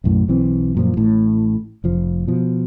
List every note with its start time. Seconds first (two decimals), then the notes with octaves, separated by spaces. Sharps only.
0.04 B1 F#2 A2
0.28 B1 E3 C4
0.75 F#2 A#2 F3
0.97 A1 A2
1.84 F1 F3
2.28 B2 F3